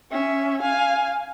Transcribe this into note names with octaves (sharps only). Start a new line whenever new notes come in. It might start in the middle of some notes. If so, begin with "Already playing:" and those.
C#4 E5
F5 G#5